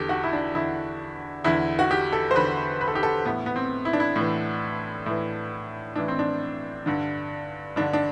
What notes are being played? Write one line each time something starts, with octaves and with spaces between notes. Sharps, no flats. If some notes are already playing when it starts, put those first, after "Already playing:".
Already playing: E2 D3 G4 A4
F#4
E4
D4
E2 D3 E4
E2 D3 E4
F#4
G4
A4
C5
E2 D3 B4
B4
A4
G4
A4
A2 E3 B3
B3
C4
E4
D4
E4
A2 E3
A2 E3
A2 E3 D4
C4
D4
G2 D3
G2 D3 D4
D4